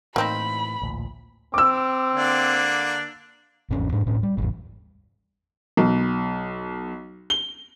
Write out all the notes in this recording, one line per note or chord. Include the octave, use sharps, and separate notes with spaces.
A2 E3 A#3 C4 D#4 B5
A1 D2 A#2
C4 D6 E6
D3 A#3 D4
G#1 E2 C#4
G#2 D4
D1 A2 C#4
G3
G#1 E2
B1
G7